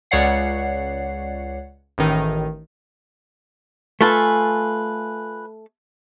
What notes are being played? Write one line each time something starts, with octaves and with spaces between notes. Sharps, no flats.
C#2 C#5 D5 F#5 C7
A1 D#3
A3 F4 A4 B4 G#5